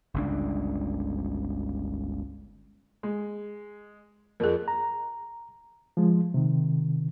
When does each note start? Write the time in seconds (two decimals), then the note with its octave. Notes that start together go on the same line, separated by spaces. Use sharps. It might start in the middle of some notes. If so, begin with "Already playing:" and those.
0.14 G1 C#2 D4
3.03 G#3
4.40 F2 G#4 A#4
4.68 A#5
5.97 F3 G#3
6.34 C3 D#3